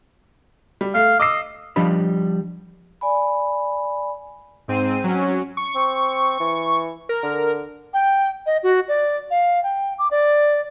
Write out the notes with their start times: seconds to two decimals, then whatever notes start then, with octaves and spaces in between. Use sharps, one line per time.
0.81 G3
0.94 A3 F5
1.20 D#5 D6 E6 C7
1.76 F3 G3 D4 D#5 B5
3.01 D5 G#5 B5
4.68 G#2 C4 D#7
5.04 F#3 C#4
5.57 C#6
5.75 C4
6.40 E3
7.09 A#4
7.23 D3
7.94 G5
8.46 D#5
8.63 F#4
8.88 D5
9.31 F5
9.63 G5
9.99 D6
10.11 D5